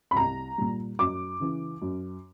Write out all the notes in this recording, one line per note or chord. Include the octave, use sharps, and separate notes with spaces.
B5
C2 A#5
A#2 G3
F#2 D6
C#3 E3
F#2